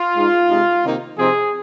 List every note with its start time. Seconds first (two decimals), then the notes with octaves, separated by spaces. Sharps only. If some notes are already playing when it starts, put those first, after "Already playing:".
Already playing: F4
0.15 G#2 G#3 D#4
0.49 C3 G#3 D#4
0.83 C3 D#3 A#3 D#4
1.17 C3 F3 C4 D#4 G#4